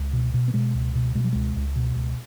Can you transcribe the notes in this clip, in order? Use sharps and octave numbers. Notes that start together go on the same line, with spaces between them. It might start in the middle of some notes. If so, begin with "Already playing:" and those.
Already playing: C#2
B2
B2
B3
B2 G#3
C#2
B2
B2 G#3
F#3
C#2 G#3
C#2
B2
C#2